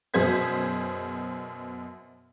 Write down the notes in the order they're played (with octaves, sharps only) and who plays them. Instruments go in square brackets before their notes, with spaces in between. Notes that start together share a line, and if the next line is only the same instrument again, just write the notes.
[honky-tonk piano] F#2 B2 G#4 C5 G#6 B6